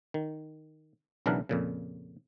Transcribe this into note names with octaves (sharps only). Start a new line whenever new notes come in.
D#3
B1 C#3 E3 D4 A#4 F#5
F2 A#2 C#3